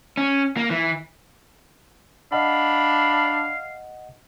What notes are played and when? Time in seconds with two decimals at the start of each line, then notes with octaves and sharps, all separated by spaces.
0.17 C#4
0.57 A#3
0.70 E3
2.32 D4 D#5 F5 F#5 B5